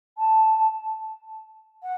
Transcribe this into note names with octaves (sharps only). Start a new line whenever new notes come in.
A5
F#5